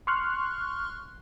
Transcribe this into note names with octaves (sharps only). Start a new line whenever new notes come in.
C6 C#6 F6 F#6